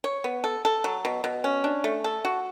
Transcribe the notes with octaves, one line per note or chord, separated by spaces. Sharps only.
C#5
B3
A4
A4
F#3
B2
B2
C#4
D4
A3
A4
F#4